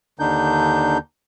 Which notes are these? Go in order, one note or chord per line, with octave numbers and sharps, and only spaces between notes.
D#2 D3 D4 D#4 G6